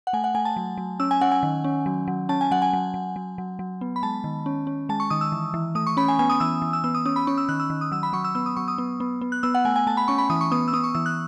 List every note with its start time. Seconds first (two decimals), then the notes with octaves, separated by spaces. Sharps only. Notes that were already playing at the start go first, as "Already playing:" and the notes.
0.07 F#5
0.13 A3 G#5
0.24 F#5
0.35 A3 G#5
0.45 A5
0.56 F#3
0.77 F#3
1.00 C#4 E6
1.11 G#5
1.21 C#4 F#5
1.32 G#5
1.43 D#3
1.64 C#4
1.86 F#3
2.08 F#3
2.29 C#4 A5
2.41 G#5
2.51 F#3 F#5
2.62 G#5
2.73 F#3
2.94 F#3
3.16 F#3
3.38 F#3
3.59 F#3
3.81 B3
3.96 B5
4.03 G#3 A5
4.24 D#3
4.46 C#4
4.67 C#4
4.89 G#3 A5
5.00 C#6
5.10 D#3 D#6
5.21 E6
5.32 E3
5.54 E3
5.75 A3 D#6
5.87 C#6
5.97 C#4 B5
6.08 G#5
6.19 B3 G#5
6.30 D#6
6.40 E3 E6
6.62 E3
6.73 E6
6.84 B3 E6
6.95 D#6
7.05 C#4 D#6
7.16 B5
7.27 C#4 C#6
7.38 E6
7.49 D#3 F#6
7.60 E6
7.70 D#3
7.81 D#6
7.91 F#3 E6
8.03 B5
8.13 F#3 C#6
8.25 E6
8.35 B3 E6
8.46 D#6
8.56 F#3 C#6
8.68 D#6
8.78 B3
9.00 B3
9.21 B3
9.32 F#6
9.43 B3 E6
9.55 F#5
9.65 A3 G#5
9.76 G#5
9.87 A3 A5
9.97 B5
10.08 C#4 C#6
10.18 B5
10.30 E3 D#6
10.41 C#6
10.52 B3 D#6
10.68 E6
10.73 B3 D#6
10.84 C#6
10.95 E3 E6
11.06 F#6